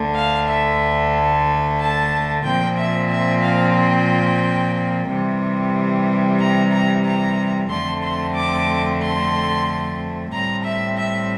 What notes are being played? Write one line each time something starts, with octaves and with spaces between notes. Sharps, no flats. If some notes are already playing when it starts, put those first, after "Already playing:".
Already playing: D2 D3 A3
F5
E5
A5
A#2 F3 C4 G5
E5
E5
F5
G5
C3 E3 G3
A#5
A#5
A#5
F2 D3 A3 C4 C6
C6
D6
C6
A2 G3 C4 A#5
E5
E5